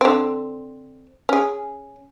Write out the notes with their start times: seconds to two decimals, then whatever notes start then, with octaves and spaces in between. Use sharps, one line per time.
0.01 D3 C4
1.29 C#4 G#4